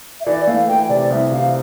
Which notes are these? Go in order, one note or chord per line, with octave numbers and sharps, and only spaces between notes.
E5
E3 D5
A3 F5
E3 G5
C3 D5
C2 E5
C3 F5